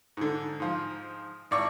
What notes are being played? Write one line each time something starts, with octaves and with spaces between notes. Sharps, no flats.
G#2 D3
G#2 F3
G#1 D5 C#6